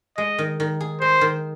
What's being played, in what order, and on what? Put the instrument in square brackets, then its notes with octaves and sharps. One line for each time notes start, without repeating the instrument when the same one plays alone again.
[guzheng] G#3 [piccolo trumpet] D#5
[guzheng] D#3
D#3
G#4
[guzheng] G#3 [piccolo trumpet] C5
[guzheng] D#3